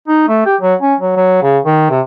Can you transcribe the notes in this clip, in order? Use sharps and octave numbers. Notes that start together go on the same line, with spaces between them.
D#4
A3
G4
F#3
C#4
F#3
F#3
C#3
D#3
C3